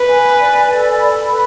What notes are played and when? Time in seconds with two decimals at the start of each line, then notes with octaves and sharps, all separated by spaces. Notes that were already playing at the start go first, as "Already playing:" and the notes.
Already playing: B4
0.08 G#5
0.39 D5
0.69 A4
1.00 B5
1.31 B4